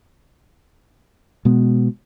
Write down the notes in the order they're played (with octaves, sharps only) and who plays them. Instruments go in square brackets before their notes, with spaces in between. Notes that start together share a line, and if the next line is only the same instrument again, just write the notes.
[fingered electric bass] B2 G#3 B3